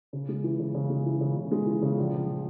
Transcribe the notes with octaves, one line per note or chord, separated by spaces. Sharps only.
C#3
G#3
E3
C#3
C#3
G#3
E3
C#3
C#3
G#3
E3
C#3
A#1
F3